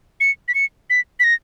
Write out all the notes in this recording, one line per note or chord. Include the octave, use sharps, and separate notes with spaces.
C#7
B6
C#7
B6
B6
A#6